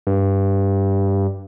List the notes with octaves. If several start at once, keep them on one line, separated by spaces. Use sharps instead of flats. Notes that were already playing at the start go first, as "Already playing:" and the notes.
G2